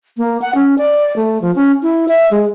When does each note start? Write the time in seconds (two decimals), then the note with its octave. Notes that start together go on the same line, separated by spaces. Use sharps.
0.17 A#3
0.42 F#5
0.55 C#4
0.78 D5
1.16 A3
1.42 F3
1.55 C#4
1.83 E4
2.08 E5
2.31 G#3